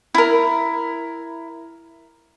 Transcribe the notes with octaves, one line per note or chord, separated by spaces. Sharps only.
E4 A#4